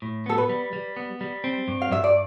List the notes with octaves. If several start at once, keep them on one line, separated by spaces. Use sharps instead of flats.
A2
B3 A4
B4
G3
G3
B3
G3
C4
G2
F5
G2 E5
D5